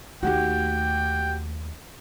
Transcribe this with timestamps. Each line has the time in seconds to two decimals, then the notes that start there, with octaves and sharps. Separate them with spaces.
0.23 D#2 A3 F#4 G4 G5